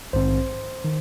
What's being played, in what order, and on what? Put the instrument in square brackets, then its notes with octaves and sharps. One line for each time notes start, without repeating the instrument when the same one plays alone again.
[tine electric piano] A#1 G#2 D#3 C4 C5
D#3